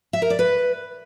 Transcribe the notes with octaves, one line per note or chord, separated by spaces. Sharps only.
E5
A#4
D5
B4